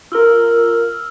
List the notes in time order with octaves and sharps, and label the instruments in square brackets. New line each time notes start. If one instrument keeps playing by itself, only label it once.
[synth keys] F4 A#4 [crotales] E6 F6